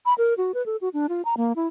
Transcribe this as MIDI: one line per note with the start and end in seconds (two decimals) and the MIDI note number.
0.06 0.14 83
0.18 0.34 70
0.37 0.52 66
0.54 0.64 71
0.66 0.76 69
0.81 0.89 66
0.94 1.07 62
1.09 1.22 65
1.25 1.37 82
1.37 1.53 58
1.56 1.67 64